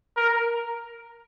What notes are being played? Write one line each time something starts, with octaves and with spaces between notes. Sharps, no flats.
A#4